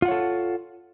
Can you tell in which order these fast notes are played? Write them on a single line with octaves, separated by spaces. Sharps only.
F4 F#5 C#5 A4